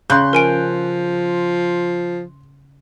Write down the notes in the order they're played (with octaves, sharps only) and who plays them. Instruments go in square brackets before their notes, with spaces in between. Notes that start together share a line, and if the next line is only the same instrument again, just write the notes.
[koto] C#3 [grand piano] C6 F#6 G6
[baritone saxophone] F3 [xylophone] A#4 G#5 D7